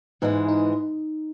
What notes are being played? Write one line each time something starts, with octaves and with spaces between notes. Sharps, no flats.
G#2 E3 G#3 D#4
D#4